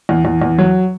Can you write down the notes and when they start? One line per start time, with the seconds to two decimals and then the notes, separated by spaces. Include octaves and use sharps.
0.09 E2
0.25 E2
0.42 E2
0.58 F#3